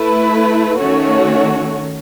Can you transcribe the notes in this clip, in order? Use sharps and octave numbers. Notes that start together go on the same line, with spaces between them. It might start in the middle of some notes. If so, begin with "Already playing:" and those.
Already playing: A3 E4 B4
D#3 A3 C#4 F#4 C#5